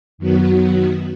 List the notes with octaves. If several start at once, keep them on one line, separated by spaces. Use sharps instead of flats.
F#2 D#3 F#3 B3 F#4